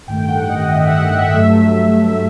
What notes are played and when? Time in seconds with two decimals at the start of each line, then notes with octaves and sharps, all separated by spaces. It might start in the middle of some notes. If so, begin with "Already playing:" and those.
0.07 A1 G2 D#3 A3 G5
0.29 F#5
0.49 D#5
0.70 A1 G2 D#3 A3 E5
0.87 F#5
1.03 F#5
1.18 E5
1.34 G2 F#3 A3